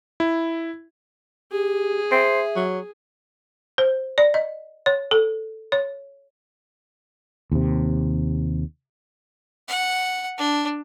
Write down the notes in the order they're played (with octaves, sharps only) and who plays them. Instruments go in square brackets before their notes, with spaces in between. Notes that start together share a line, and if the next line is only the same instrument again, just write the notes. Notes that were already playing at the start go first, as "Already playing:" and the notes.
[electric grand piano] E4
[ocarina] G4 [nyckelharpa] G#4
[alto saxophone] C5 [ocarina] E5
[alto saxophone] F#3
[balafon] C5
D5
D#5
C#5
A4
C#5
[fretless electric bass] D#2 C3
[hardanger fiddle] F#5
D4